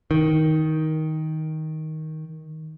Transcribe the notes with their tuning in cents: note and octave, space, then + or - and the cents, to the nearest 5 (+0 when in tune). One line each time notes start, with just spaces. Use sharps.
D#3 +10